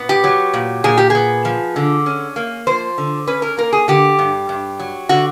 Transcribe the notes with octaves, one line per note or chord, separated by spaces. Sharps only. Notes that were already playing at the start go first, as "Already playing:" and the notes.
Already playing: A#2 B3
G4
F#3
A#2
A#2 G#4
G4
B3 G#4
F3
D3
C#4
A#3
F3 C5
D3
C#4 B4
A#4
A#3 A#4
G#4
D3 G4
G2
G2
F#3
D3 F#4